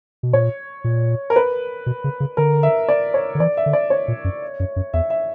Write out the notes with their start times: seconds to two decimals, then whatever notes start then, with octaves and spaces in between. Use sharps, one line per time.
0.23 B2
0.33 A#2 C#5
0.84 A#2
1.30 A#4
1.36 B4
1.86 B2
2.04 C#3
2.20 C#3
2.37 D3 A#4
2.63 E5
2.88 D5
3.14 C#5
3.35 D3
3.40 E3 D5
3.57 E5
3.66 D3
3.73 D5
3.90 C#5
4.08 A#2
4.24 F#2
4.60 F#2
4.76 F#2
4.94 E2 E5
5.10 E5